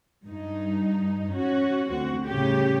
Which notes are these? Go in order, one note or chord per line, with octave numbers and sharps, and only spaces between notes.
G2 D#4
C#4 F#4
D2 C4 F#4
A2 C#3 G3 C#4 G4